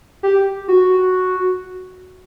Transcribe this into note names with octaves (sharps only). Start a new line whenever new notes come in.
G4
F#4